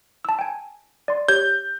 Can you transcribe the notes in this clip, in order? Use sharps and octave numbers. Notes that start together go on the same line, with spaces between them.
A5 E6
G5 G#5
D5 C6
G4 C#5 G6